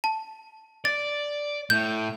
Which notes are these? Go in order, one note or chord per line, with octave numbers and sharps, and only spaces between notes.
A5
D5 A6
A2 G6